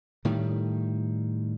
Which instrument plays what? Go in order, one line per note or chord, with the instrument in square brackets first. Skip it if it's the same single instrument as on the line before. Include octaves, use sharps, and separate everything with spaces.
[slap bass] A2 D#3 G3